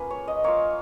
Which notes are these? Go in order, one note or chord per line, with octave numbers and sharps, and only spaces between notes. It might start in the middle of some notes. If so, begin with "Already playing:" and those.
Already playing: A#3 C#4 F4 G#4 B4
C#5
D#5
A#3 F4 C#5